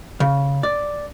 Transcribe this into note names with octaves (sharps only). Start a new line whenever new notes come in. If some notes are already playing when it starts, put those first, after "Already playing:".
C#3
D5